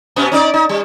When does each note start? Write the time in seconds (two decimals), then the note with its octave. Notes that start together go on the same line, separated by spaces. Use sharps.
0.16 B2 B3 C#4
0.32 C#4 D#4 D5
0.54 D#4
0.69 G3